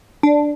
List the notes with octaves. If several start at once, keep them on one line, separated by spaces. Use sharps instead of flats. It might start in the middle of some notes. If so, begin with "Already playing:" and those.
D4